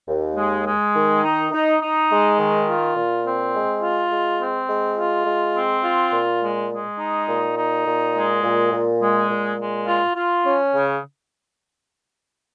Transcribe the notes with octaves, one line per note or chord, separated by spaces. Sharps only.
D#2
G#3
G#3
D#3
D#4
D#4
D#4
G#3
D#3
F4
A#2
C4
G#3
F4
G#3
C4
G#3
F4
G#3
C4
F4
A#2
G#3
G#3
D#4
A#2
D#4
A#2
G#3
A#2
A#2
G#3
A#2
G#3
F4
F4
C#4
C#3